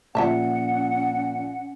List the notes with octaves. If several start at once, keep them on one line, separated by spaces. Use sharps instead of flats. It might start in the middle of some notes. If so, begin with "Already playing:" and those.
A#2 C#3 F3 C#4 E5 F#5 A5